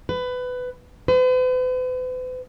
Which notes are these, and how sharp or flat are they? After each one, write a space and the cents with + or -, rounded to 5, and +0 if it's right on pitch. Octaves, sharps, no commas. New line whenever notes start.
B4 +20
B4 +45